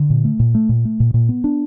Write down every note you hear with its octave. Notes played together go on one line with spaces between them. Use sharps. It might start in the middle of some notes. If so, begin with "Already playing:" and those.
Already playing: D3
A#2
A3
A#2
A3
A#2
A3
A#2
A#2
B3
D4